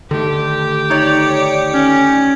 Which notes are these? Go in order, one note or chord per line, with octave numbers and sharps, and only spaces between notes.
D3 D#3 A3 G4
D#4 C#5 D5
C#4